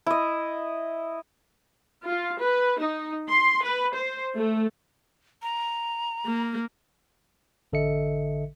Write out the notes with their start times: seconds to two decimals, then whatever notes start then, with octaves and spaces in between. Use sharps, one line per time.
0.06 E4 D#5
2.07 F4
2.41 B4
2.79 D#4
3.27 C6
3.62 B4
3.95 C5
4.35 A3
5.42 A#5
6.26 A#3
7.73 A1 D3 A4 D#5 E5 C#7